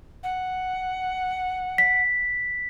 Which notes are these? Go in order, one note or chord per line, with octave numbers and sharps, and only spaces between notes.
F#5
B6